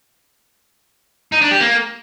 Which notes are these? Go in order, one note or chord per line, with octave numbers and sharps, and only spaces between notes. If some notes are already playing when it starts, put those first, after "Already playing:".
D#4
D4
G4
A#3